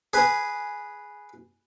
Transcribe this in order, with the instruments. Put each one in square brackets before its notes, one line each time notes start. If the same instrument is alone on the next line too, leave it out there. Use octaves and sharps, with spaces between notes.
[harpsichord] G#4 B4